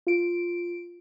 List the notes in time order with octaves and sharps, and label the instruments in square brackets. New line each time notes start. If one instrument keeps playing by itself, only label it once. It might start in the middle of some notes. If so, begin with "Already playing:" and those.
[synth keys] F4 D7